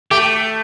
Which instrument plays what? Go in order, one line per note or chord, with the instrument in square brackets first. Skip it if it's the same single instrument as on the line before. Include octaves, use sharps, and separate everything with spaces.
[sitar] A3 [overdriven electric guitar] G4